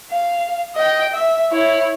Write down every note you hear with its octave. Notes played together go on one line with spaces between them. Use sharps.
F5
D#5 G5
E5
E4 C#5